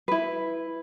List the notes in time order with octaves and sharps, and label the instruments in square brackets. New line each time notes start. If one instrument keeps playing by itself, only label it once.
[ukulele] E4 B4